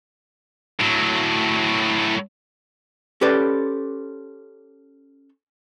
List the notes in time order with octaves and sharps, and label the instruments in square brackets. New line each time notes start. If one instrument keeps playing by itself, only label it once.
[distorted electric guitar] A2 F#3
[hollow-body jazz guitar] C#4 G4 A4 B4 C5 D5